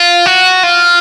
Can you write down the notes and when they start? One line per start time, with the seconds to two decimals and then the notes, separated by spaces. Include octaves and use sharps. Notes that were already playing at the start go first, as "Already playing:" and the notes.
Already playing: F4
0.26 F#4
0.63 F4